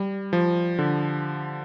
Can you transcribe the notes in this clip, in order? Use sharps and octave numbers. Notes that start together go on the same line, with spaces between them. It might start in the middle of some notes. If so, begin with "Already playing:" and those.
Already playing: G3
F3
D3